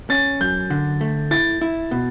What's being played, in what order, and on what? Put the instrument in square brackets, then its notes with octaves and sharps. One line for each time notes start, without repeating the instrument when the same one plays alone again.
[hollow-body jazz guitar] C#4 [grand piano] A6
[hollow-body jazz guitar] F#2 [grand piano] G6
[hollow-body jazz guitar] D3
A3
[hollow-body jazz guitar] E4 [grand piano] A6
[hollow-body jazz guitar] E4
B2